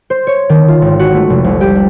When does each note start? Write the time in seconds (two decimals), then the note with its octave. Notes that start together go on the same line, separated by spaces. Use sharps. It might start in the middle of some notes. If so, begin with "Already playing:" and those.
0.10 C5
0.27 C#5
0.49 D#3
0.68 F4
0.82 G#1
0.99 F#4
1.14 A3
1.30 F1
1.44 C2
1.61 G4
1.75 D4